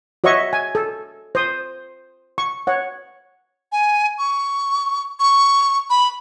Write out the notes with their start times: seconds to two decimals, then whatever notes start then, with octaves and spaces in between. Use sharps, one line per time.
0.24 F#4 C#5 D#5 E5 C#6
0.53 G#5
0.75 A4
1.35 C5 D#6
2.38 C#6
2.67 C#5 F#5
3.72 G#5
4.19 C#6
5.20 C#6
5.90 B5